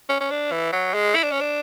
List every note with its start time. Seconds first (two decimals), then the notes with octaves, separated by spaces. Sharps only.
0.09 C#4
0.20 C#4
0.31 D4
0.51 E3
0.72 F#3
0.94 G#3
1.15 E4
1.23 D4
1.32 C#4
1.40 D4